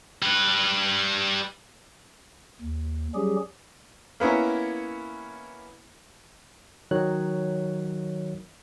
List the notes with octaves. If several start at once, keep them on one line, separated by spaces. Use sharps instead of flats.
G3 B4
D#2
F#3 G3 C#4 G4 G#4
A#3 B3 C#4 E4
D#3 F#3 C#5 F#6